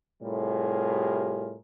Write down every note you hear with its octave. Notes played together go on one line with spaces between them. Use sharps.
A2 C3 G3 F4 G#4 A#4